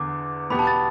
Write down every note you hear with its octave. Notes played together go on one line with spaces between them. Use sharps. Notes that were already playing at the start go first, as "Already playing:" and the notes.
Already playing: E2 D3 D6
E2 B2 B3 G4 B5
A5
A6